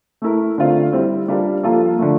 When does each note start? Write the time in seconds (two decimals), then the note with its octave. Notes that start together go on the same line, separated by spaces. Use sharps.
0.22 A3 E4 A#4
0.58 D3 A3 C4 F4
0.93 G3 C4 E4
1.28 G3 D4 F4 A#4
1.63 F3 A#3 F4 A4
1.99 D3 F3 A3